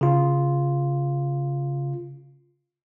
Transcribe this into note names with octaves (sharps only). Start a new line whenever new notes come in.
C#3 F4